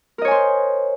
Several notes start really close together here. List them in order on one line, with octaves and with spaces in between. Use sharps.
A#4 D#5 C#5 G#5 C5